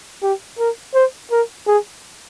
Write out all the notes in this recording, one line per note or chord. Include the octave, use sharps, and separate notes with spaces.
G4
A#4
C5
A#4
G#4